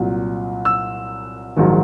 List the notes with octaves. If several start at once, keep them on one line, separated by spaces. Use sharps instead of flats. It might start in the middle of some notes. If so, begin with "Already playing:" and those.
Already playing: C2 A#2 F#3
E6
A#1 G#2 D#3 F#3